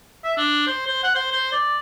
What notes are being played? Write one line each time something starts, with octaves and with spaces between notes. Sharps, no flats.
E5
D4
C5
C5
F#5
C5
C5
D5